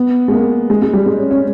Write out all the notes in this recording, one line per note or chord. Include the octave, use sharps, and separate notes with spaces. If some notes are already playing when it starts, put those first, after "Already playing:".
Already playing: B3
G#3
A#3
G#3
G#3
G3
G#3
C#4
C#4